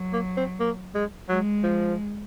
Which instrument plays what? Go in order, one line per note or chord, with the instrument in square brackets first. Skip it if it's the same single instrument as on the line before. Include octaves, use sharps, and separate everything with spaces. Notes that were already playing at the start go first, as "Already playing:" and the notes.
Already playing: [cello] F#3
[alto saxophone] A#3
C4
A#3
G#3
[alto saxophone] F#3 [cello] G#3
[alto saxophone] F3